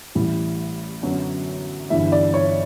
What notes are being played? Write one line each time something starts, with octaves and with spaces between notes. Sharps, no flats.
A1 A2 G3
F#2 D3 F#3 B3 D4
G1 G2 E3 G3 E5
D5
C#5